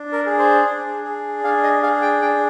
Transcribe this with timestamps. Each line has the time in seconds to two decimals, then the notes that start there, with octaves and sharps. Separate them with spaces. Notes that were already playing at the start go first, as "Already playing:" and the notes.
Already playing: D4
0.13 A#4
0.26 G#4
0.39 C5
0.65 D4
1.04 G#4
1.44 D4 F5
1.63 D#5
1.83 G#4 F5
2.02 G5
2.22 D4 G5